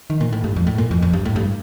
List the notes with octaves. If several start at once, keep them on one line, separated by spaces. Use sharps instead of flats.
D#3
A#2
A2
G2
F2
A2
A#2
F2
F2
G2
A2
G2